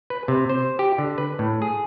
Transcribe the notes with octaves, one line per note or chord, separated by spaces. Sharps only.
B4
C3
C5
G4
D3
B4
A2
G#4